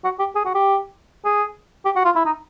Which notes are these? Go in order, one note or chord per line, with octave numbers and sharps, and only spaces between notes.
F#4
G4
G#4
F#4
G4
G#4
G4
F#4
F4
E4
D#4